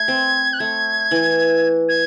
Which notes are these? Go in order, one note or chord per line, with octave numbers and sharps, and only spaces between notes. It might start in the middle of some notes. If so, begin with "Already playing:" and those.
Already playing: A3 G#6
C4
F#6
A3 G#6
E3
G#6